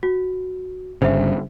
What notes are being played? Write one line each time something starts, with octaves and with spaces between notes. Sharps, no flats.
F#4
G1 G2 C#3 C5 E5